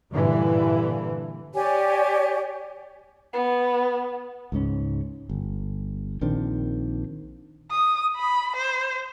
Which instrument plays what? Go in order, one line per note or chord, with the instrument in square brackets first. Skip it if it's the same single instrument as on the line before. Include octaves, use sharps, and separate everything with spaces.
[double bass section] G2 A#2 D3 E3
[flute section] G4 C#5 D5 G#5
[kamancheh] B3
[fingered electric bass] C#2 G#2 C#4
G1
A#1 D#3 C4 D4
[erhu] D#6
B5
C5